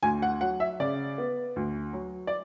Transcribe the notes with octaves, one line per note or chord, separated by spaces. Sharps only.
D2 G#5
F#5
F#3 F#5
E5
C#3 D5
B3
D2
F#3
D5